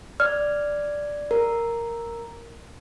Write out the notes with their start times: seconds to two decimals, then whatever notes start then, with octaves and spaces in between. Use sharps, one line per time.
0.20 D5 F6
1.31 A#4